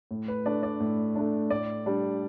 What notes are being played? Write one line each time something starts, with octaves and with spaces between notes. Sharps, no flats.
A2
B4
A3 D4 D5
D5
A2
A3 D4
A2 D5
G3 D4